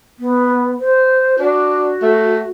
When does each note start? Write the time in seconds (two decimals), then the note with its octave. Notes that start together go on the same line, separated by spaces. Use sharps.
0.19 B3
0.79 C5
1.40 D4 F#4
2.02 A3